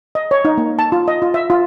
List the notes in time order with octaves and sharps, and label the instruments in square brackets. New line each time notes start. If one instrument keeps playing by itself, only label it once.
[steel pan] D#5
C#5
D#4
A#3
A5
F4
D#5
F4
E5
F4